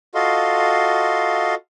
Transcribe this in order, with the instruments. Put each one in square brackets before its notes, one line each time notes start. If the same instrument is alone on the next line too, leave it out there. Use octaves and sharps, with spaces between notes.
[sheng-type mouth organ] F4 F#4 A4 D#5 F5 C6